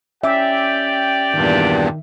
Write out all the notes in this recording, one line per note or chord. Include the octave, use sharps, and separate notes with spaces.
C#4 G4 D5 E5 G5 D6
E2 G2 A#2 D#3